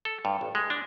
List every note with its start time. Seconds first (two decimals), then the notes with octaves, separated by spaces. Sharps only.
0.05 A4
0.25 G2
0.41 A1
0.55 G#3
0.70 D4